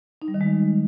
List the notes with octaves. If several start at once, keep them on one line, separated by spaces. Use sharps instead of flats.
D#4
G3
D#3
G#3